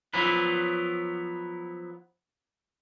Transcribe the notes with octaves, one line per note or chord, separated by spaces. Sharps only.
F3 F#3 B3 E4 B4